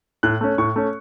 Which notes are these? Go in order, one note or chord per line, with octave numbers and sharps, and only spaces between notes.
A2 F#6
A3 C#4
A2 C#6
A3 C#4